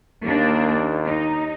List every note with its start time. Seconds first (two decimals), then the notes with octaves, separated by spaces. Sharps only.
0.23 D#2 A#3 D4
1.07 D#4